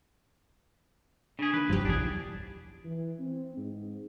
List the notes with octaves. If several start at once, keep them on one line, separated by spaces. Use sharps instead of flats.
C#3 D4 G#4
D#3 A#3 B4
F1 C#2 G2 F3 F#3 G4
F#1 B1 E2 D4 E4 G#4
E3
C4
G#2